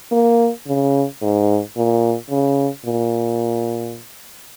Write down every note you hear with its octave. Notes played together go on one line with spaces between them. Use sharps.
A#3
C#3
G#2
A#2
C#3
A#2